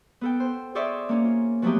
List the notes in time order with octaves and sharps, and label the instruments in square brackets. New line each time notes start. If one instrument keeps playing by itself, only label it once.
[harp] B3 A4 G5
C5
G#4 C5 D5 E5 C#6
A#3 C#4
F4
F3 F#3 A3 B3 D#4 G4